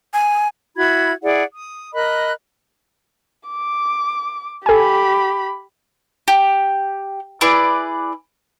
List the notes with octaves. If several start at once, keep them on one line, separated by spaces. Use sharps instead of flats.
G#5
E4 F#4 B5 G#6
E4 G#4 D5 F#5
D#6
A#4 D#5 B5 F#6
D6
G4 A4 G#5 B5
G4
E4 G#4 B4 D5